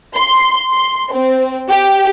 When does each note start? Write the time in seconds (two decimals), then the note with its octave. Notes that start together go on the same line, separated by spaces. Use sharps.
0.15 C6
0.73 C6
1.13 C4
1.69 G4